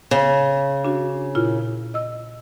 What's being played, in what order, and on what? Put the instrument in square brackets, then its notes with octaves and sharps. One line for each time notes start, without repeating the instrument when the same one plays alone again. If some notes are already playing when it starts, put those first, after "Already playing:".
[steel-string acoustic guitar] C#3
[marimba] D4 F#4
A#2 E4 F4
D#5 E6